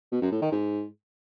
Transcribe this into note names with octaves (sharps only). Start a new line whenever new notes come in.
B2
F#2
A2
D#3
G#2